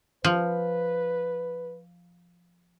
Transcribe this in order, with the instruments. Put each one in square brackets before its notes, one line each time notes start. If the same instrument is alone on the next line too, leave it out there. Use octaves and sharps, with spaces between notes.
[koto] F3 [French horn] B4